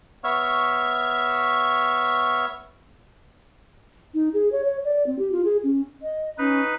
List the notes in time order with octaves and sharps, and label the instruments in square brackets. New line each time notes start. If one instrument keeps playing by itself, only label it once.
[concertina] B3 C#5 E5 C#6 F6
[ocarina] D#4
G#4
C#5
C#5
D5
C4
G4
F4
G#4
C#4
[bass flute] D#5
[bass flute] C#4 [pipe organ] D#4 B4